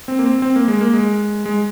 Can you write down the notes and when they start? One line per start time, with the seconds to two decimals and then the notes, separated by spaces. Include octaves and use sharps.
0.08 C4
0.19 A#3
0.26 C4
0.42 C4
0.56 A#3
0.68 G#3
0.81 A#3
0.94 G#3
1.45 G#3